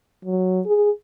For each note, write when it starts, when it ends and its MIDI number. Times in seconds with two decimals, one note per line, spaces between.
0.25 0.61 54
0.66 0.91 68